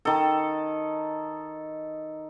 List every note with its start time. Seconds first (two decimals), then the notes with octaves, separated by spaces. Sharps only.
0.05 D#3 A4